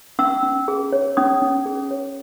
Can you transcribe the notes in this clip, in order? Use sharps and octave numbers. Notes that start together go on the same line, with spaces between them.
C#4 E6
C#4
G#4
C#5
C#4 D#6
C#4
G#4
C#5